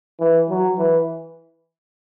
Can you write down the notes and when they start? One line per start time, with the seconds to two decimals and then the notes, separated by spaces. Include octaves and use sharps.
0.20 E3
0.49 F#3
0.78 E3